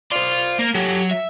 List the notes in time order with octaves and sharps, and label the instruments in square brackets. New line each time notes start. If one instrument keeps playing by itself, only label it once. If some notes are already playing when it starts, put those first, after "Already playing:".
[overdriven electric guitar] C5 D5 [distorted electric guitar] F5 C6
[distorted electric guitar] A#3
[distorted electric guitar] F#3 [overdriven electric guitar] G4 A4
[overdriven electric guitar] E5